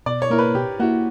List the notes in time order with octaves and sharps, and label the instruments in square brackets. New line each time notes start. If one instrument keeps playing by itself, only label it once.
[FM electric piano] B2 [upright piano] D5
[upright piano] C#5
[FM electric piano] A#3 E4 [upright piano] A#4
[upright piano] B4
[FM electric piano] B2 [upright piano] G4
[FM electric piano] A#3 E4 [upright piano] F#4